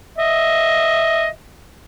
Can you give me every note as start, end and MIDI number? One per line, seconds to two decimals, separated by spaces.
0.18 1.27 75
0.18 1.27 76